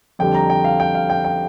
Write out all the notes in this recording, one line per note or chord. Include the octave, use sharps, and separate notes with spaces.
F2 D3 G3 G5
A#5
G5
F5
G5
F5
G5
G5